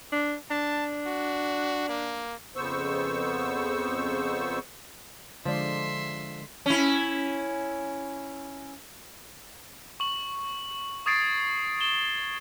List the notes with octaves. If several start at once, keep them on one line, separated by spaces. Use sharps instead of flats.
D4
D4 A5
F#4
A#3
F2 C#3 B3 C5 C#6 E6
D3 F3 G#3 D5 E5 C6
C#4 E4
C#6 F#7
C#6 D#6 G#6 A6 C7 D7
E7 G7